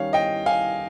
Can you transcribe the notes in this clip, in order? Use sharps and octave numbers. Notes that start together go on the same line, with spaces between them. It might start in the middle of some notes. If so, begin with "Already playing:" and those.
Already playing: D#3 G3 C#4 C#5 F5
D#5 G5
F5 G#5